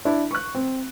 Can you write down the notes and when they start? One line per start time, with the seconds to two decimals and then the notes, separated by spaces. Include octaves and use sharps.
0.05 D4 E4
0.31 C#6 F#6
0.55 C4